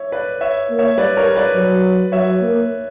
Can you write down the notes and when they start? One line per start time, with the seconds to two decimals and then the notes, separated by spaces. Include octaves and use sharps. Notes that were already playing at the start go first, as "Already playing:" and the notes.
Already playing: C#5 E5
0.12 B4 D5
0.41 C#5 E5
0.70 A#3
0.79 C#5 E5
0.97 G3 B4 D5
1.17 A#4 C#5
1.36 B4 D5
1.55 F#3
2.12 F#3 C#5 E5
2.41 A#3